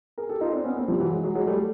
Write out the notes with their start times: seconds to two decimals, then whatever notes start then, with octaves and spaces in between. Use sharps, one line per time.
0.18 G#4 A#4
0.29 G4 A4
0.41 D#4 F4
0.53 C4 D4
0.64 B3 C#4
0.77 A#3 C4
0.88 F3 G3
1.00 E3 F#3
1.11 F#3 G#3
1.23 F#3 G#3
1.35 F#3 G#3
1.47 G3 A3